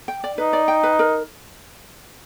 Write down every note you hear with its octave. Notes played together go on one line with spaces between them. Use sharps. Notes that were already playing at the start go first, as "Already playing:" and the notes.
G5
D5
D#4 B4
D5
G5
B4
A#4